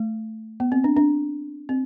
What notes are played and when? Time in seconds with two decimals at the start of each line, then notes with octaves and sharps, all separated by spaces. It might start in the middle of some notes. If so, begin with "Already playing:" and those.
Already playing: A3
0.60 B3
0.72 C4
0.84 D4
0.97 D4
1.69 C4